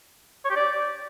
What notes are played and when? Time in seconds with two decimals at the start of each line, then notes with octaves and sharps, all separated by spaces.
0.44 C#5
0.50 G4
0.56 D5